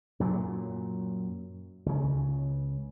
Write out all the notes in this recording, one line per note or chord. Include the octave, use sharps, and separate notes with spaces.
F#2 A#2 F#3
C#2 C#3